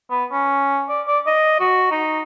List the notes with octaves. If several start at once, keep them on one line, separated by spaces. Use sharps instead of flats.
B3
C#4
D5
D5
D#5
F#4
D#4